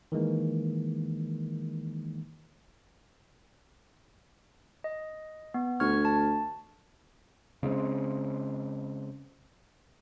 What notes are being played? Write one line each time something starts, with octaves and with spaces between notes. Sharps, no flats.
D#3 E3 G#3 A#3
D#5
B3
D2 C#6 F6 G#6
A5
C#3 G#3 A3 C4